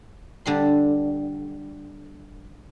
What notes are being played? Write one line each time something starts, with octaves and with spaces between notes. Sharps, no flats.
D3 G3 C6